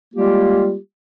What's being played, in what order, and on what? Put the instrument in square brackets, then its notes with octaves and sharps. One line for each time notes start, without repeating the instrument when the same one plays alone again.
[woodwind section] G3 G#3 A#3 F4 G4